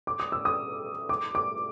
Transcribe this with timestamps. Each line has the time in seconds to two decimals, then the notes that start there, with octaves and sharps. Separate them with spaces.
0.07 D6
0.20 D#6
0.32 E6
0.45 D#6
1.09 D6
1.35 D6